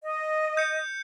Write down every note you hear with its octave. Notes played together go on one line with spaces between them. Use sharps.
D#5
G6 C#7